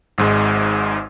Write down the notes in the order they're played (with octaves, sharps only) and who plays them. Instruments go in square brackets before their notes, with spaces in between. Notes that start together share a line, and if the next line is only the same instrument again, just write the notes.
[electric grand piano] G#1 G#2 G#3